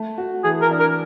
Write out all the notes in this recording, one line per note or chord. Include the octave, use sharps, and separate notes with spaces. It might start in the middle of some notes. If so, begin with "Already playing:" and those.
Already playing: A3
F#4
E3 G#4
A#4
D4
A#4